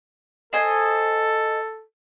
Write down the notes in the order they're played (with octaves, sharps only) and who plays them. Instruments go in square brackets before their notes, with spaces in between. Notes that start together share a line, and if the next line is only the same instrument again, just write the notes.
[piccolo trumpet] A4 [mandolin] C5 D#5 G#5